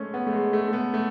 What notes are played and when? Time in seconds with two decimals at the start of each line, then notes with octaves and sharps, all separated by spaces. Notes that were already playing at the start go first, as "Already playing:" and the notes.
Already playing: G#3 A3 C#4
0.14 B3
0.27 A3
0.33 G#3
0.53 A3
0.68 A3
0.73 B3
0.94 A3